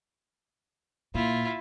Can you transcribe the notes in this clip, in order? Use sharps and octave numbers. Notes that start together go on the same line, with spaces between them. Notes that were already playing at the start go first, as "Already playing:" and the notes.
A#2 E4 F4